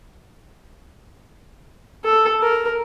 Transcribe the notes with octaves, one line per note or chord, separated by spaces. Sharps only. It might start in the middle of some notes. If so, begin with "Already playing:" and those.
A4
A#4